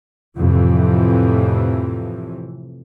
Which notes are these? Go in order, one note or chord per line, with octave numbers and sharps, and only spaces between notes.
F2 A2 C3 E3